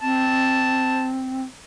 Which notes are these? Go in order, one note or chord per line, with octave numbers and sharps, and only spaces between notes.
C4 A5